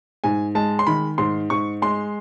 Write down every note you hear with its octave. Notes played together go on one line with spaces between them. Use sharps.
G#2 G#5
G#3 A5
C6
D#3 B5
G#2 C6
G#2 C#6
G#3 C6